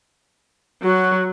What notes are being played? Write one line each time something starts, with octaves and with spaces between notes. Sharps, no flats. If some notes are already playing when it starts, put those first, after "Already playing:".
F#3 F#4